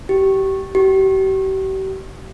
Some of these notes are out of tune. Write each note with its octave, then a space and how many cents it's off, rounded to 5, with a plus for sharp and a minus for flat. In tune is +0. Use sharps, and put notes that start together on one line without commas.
G4 -25
G4 -40